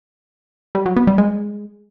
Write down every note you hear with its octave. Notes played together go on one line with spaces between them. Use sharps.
G3
F#3
B3
G3
G#3